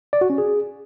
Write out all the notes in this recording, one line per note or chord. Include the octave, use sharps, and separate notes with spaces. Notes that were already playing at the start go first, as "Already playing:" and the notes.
D5
F#4
C#4
G#4